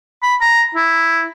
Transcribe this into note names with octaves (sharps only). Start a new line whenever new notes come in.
B5
A#5
E4